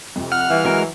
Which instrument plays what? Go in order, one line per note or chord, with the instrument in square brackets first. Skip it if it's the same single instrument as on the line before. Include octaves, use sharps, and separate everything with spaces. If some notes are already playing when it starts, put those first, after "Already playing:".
[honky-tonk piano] F2 C3
[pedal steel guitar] F#5 [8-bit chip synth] F6
[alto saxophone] E3 [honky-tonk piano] G3 E5 F5
[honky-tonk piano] F#3 [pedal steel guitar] G#3 F#4 A#4